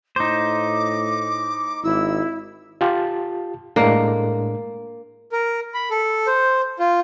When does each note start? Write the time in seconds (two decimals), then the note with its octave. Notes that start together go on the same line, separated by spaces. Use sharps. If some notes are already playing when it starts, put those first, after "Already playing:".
0.16 A2 D#4 C5 D6
1.83 G#1 E4 E6
2.81 F4 G4 A5
3.76 A2 G#3 A#3 D4
5.32 A#4
5.74 B5
5.91 A4
6.27 C5
6.79 F4